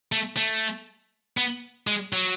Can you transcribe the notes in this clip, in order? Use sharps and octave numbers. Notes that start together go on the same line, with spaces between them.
A3
A3
B3
G#3
F#3